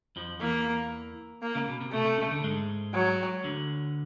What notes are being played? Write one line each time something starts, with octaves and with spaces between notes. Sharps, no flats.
F2 F3
E2 E3 A#3
A#3
C#2 C#3
B2
C3
B2 A3
C3
C#2 C#3
D2 D3
G#2 G#3
F#3
D2 D3